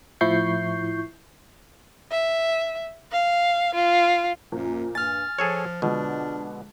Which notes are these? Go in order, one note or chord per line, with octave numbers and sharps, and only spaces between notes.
A2 F3 E4 C#6 G6 C7
E5
F5
F4
F#2 A#2 F3 A#3
G2 G#5 F6 A6
F3 G#4 A4 C#5
B2 D3 F3 G#3 D4